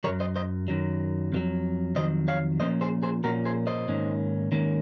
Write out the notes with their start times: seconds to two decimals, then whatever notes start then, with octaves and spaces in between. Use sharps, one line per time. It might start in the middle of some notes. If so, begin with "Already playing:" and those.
0.04 F#2 D#3 F#3 A#4 C#5
0.20 C5 D#5
0.36 C5 D#5
0.68 F#2 D#3 F#3
1.32 F2 D#3 F#3
1.95 F2 D#3 F#3 C5 D#5
2.28 C#5 F5
2.60 A#2 F3 A#3 C#4 C5 D#5
2.81 G#4 C5
3.03 G#4 C5
3.24 A#2 F3 A#3 C#4 F#4 A#4
3.45 G#4 C5
3.67 C5 D#5
3.88 G#2 D#3 A#3 C#4
4.52 G#2 D#3 A#3 C#4